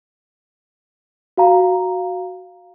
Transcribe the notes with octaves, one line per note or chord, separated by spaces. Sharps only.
F#4 F5 A#5